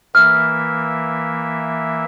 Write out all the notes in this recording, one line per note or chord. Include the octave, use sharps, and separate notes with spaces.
E3 A#3 E5 F6